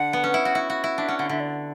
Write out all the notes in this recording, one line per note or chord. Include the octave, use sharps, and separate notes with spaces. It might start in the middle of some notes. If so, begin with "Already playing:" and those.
Already playing: D3 F#5
B3
C#4
E4
F#4
E4
F#4
E4
D4 E5
C#4 F#5
D3 F#5
D3 E5
D5